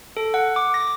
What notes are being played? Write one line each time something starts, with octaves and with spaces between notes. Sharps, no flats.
A4
F#5
D6
A#6